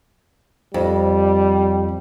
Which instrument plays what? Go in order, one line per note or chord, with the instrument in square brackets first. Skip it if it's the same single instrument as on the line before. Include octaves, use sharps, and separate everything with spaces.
[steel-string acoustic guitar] F2 [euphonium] G3